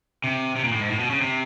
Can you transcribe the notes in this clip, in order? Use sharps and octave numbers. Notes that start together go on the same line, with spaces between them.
C3
C3
A#2
A2
G#2
A2
B2
C#3
C3